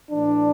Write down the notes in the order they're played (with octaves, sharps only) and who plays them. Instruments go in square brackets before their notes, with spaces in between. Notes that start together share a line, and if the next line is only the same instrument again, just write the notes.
[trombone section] A2 E3 D4